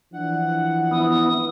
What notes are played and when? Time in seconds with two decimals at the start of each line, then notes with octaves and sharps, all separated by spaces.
0.13 E3 F3 D4 F#5
0.91 B3 E4 D#6